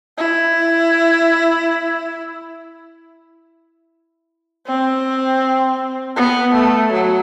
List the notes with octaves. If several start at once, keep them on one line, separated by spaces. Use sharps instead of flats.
E4
C4
B3
A3
F#3